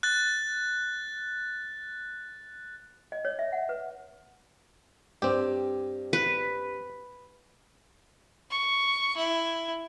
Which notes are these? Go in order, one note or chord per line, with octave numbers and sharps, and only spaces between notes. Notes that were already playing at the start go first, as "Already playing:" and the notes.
F#6 A6
D#5
C#5
E5
F#5
B4
G2 C4 G4
B4
C#6
E4